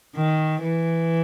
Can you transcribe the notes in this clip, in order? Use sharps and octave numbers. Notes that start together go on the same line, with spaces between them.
D#3
E3